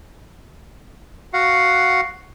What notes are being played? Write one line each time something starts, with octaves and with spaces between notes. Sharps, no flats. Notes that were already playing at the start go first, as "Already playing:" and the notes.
F#4 F5 F#5